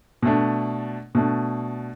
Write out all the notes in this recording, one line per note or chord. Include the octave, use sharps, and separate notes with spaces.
B2 A3 D4
B2 A3 D4